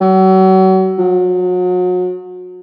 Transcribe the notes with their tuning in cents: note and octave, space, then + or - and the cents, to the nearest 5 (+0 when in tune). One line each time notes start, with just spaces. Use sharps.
F#3 +35
F#3 -35